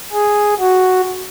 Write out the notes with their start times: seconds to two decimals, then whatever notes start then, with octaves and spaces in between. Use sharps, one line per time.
0.13 G#4
0.59 F#4